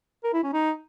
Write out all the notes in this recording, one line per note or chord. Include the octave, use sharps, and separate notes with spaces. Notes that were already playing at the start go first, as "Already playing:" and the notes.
A#4
E4
C#4
D#4